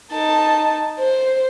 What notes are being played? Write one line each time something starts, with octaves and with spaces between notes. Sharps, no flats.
D#4 A5
C5